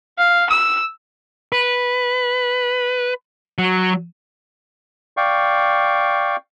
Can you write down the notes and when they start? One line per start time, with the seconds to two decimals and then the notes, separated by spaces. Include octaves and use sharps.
0.18 F5
0.50 E6
1.52 B4
3.58 F#3
5.17 D5 F5 G5 C#6